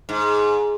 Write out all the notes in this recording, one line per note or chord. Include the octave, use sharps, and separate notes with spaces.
G#2